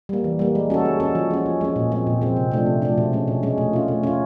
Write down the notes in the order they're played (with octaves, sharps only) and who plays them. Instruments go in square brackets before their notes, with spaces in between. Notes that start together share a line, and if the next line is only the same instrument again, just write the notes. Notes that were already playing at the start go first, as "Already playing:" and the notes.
[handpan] G3 A#3
E3
G3 A#3
G#3
C#4 F#4 A4
G#3
C#4 F#4 A4
F3
G#3 C#4
F3
G#3 C#4
A#2
F3 G#3 C4
A#2
F3 G#3 C4
C3
F3 A3 D4
C3
F3 A3 D4
B2
G#3 C#4
B2
G#3 C#4
A3
C#4 F4
A3
C#4 F4